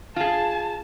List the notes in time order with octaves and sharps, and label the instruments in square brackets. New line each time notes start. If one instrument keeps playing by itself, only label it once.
[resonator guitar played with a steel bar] F4 G#4 [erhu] A5